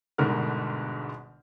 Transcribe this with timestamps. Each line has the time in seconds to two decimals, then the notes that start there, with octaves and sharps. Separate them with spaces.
0.18 G1 G#2 B2 D3 A#4 F6